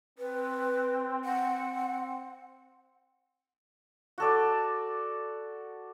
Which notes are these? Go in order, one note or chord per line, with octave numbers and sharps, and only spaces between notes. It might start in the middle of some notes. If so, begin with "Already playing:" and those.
C4 B4
F#5
F#4 A4 D5